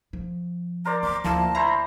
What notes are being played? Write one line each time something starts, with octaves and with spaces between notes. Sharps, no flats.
F3
A#4 C5 D5 A#5
E2 D6
D2 F3 A#3 E4 A5
E4 C5 G5 A#5